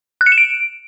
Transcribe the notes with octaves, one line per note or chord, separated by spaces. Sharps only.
F#6
C#7
E7
D7